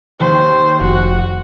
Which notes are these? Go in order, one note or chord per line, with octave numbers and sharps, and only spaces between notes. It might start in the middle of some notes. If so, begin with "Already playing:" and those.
D#2 C5
F1 F#4